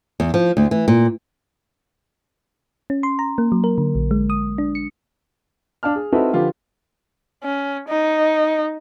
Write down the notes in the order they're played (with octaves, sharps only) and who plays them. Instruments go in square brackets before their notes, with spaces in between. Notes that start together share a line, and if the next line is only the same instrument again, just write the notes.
[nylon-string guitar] E2
F3
D2
E3
A#2
[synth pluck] C#4
C6
A#5
A#3
F#3
A#4
D3
A#1
G#3
D#6
D4
C#7
[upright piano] D4 F5 A5 F6
G#4
C4 D#4 E4 F#4 A4 B4
D3 F3 F4 G4 B4
[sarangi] C#4
D#4